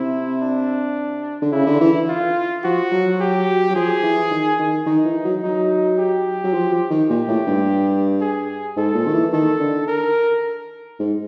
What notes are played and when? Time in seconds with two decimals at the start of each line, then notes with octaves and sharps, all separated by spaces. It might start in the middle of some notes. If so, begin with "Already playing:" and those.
Already playing: C3 E4
0.42 D4
1.42 D3
1.52 C#3 E4
1.66 D3
1.81 E3
2.09 F4
2.64 F3 F#4
2.92 F#3
3.20 G4
3.70 F#3
3.75 F3 G#4
4.03 E3
4.31 D#3
4.59 D#3
4.86 D#3 D#4
5.05 E3
5.25 F#3
5.43 F#3 D#4
5.99 G4
6.44 F#3
6.54 F3
6.72 F3
6.91 D#3
7.10 A#2 G4
7.28 A2
7.47 G2
8.21 G#4
8.77 G#2 A4
8.95 A#2
9.07 D#3
9.14 E3
9.33 D#3 A4
9.60 D3
9.88 A#4
10.99 G#2